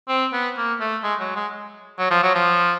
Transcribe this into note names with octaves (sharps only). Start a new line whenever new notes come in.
C4
B3
A#3
A3
G#3
F#3
G#3
F#3
F3
F#3
F3